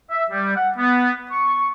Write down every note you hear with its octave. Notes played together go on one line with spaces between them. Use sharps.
E5
G3
F#5
B3
C#6